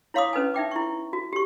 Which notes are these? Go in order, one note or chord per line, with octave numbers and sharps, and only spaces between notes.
E4 C#5 F5 C6 D6 D#6
C#4 B4 D#5 G#5
D#4 E5 G5 D6
E4 C#6
F#4
G4 C#6